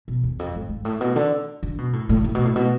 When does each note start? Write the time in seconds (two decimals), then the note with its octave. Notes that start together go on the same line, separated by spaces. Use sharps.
0.08 B2
0.23 E2
0.39 F2
0.55 G#2
0.69 G#2
0.85 A2
1.01 B2
1.16 D3
1.63 D3
1.78 B2
1.93 A2
2.09 A2
2.24 A2
2.35 B2
2.45 A2
2.56 B2